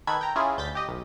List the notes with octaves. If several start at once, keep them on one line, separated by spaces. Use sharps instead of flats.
D#3 A4 B4 B5 G#6
G5 A#5
C#4 E4 F4 G#4
D2 G6 A6 B6
G4 D#5
B1